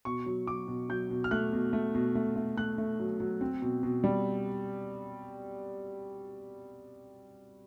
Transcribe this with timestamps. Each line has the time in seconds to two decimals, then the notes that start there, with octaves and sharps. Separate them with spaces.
0.05 B2 C#6
0.26 F#3
0.47 F#3 D6
0.68 B2
0.89 F#3 G6
1.10 B2
1.24 F6
1.31 A3 F#6
1.53 B2
1.73 A3
1.95 B2
2.15 A3
2.36 A3
2.57 A3 F#6
2.78 A3
3.00 F#3
3.20 F#3
3.41 C4
3.62 B2
3.83 B2
4.04 G3